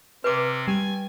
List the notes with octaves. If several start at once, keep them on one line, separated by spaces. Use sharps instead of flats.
C3 C4 B4 D6
G3 G#5